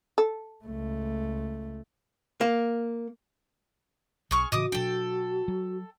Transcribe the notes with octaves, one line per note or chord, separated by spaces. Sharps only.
A4
C#2 A3
A#3
B1 G#4 C#6 F6
A2 C#3 E3 F#4 D#5 D6 D#6
B2 F#3 D4 A4 G5
F#3